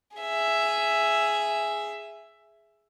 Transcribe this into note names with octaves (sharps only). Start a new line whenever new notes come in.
G#4 E5